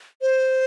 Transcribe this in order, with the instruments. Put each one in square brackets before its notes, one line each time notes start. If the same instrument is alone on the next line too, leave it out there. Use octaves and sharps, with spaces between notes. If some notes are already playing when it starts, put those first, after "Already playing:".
[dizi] C5